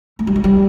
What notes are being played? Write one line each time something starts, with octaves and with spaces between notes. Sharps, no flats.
A3
G3
F#3
G3